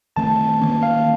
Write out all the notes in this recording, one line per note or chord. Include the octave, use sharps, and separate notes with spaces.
D#3 A3 C4 A5
D#3 A#3 C#4
F5